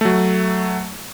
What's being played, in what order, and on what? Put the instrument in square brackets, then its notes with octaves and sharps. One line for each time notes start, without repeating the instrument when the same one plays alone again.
[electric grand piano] F#3 A3